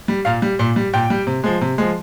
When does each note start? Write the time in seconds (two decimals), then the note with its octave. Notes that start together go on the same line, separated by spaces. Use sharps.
0.08 G3
0.25 A#2 F5
0.42 G3
0.59 A#2
0.76 G3
0.93 A#2 G5
1.10 G3
1.27 C3
1.44 F3 G#3
1.61 C3
1.78 F3 G#3